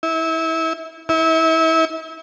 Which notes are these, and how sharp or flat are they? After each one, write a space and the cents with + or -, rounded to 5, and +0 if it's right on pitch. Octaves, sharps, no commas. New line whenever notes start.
E4 -25
E4 -30